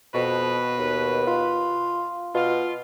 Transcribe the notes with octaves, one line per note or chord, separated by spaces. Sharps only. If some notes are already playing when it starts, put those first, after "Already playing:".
F2 B2 B4
D#2
F4
B2 F4